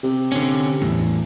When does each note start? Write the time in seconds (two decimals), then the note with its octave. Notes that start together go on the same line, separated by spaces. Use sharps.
0.04 C3
0.32 D3 C#4
0.82 E2 A2